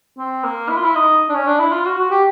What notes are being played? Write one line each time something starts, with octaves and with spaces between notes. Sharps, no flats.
C4
A#3
E4
F4
E4
D#4
D4
C#4
D4
E4
F4
F#4
F#4
G4